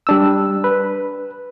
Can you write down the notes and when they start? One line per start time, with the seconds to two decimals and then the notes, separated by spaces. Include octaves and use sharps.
0.07 G3 D4 E6
0.64 B4